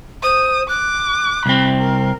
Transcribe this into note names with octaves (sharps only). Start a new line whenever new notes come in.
C5 D#6
D6 F#6
C2 C4 B5
A#4